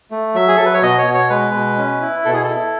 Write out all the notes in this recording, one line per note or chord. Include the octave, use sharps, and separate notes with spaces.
A3
F#3 E5
G#4
F#3 A4
B4
C#5
B2 D#5
C#5
B2
C#5
G#3 B4
B2
C#4
E4
B2 A4
G#4
A4
E4